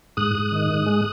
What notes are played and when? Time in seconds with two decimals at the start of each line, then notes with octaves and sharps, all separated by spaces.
0.17 G#2 D#6 F#6
0.35 G#2
0.52 D#3
0.70 G#2
0.86 G#3